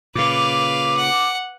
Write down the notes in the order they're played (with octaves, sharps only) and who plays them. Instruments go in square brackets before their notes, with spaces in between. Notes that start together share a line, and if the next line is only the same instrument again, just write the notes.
[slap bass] A#2 C#3 [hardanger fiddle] B4 F5 [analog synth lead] D6
[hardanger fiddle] F#5